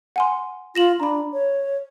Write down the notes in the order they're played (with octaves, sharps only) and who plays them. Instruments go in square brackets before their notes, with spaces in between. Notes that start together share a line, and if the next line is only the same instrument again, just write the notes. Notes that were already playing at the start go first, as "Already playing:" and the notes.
[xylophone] F#5 G#5 C6
[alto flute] F4 [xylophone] A#6 E7 F#7
[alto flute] D4 [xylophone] A#5 B5
[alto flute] C#5